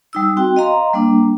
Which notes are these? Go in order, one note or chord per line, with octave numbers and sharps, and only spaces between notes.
G3 D#4 E6
C4 F#4 G5
D#5 F5 A#5 C6
G3 A#3 D4